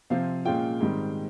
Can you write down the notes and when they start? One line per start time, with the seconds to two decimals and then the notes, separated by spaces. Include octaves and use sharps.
0.10 C3 F3 C4 F5
0.45 A#2 G#3 C#4 F4 G5
0.81 G#2 D#3 G3 C4